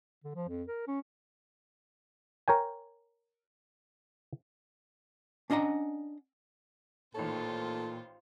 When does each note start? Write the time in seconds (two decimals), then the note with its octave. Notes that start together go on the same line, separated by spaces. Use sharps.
0.24 D3
0.35 F3
0.48 F2
0.68 A#4
0.88 C#4
2.48 A#4 C#5 G5 G#5
5.50 C#4 D4 D#5 F#5 A#5
7.15 A1 A#2 D#3 F4 A4 C5 C#5